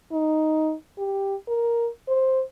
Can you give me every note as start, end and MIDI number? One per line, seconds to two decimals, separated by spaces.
0.12 0.74 63
0.99 1.35 67
1.48 1.89 70
2.08 2.43 72